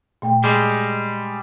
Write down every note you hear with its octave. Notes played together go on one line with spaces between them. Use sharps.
A#2 A3 G5
G3 G#3 G#4